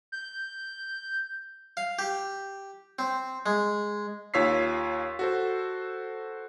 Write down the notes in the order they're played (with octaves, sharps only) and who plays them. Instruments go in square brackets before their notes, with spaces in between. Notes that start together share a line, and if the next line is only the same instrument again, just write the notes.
[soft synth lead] G6
[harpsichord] F5
G4
C4
G#3
[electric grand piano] D#2 F4 C#5 E6 B6 C7
F#4 A4 C5